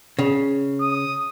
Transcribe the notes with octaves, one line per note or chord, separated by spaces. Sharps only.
C#3
D#6